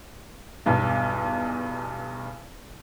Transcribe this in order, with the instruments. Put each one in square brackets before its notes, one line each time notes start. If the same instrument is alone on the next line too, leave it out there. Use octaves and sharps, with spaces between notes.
[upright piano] B1 E2 G2